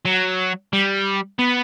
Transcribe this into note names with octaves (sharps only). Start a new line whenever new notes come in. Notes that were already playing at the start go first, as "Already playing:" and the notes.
F#3
G3
B3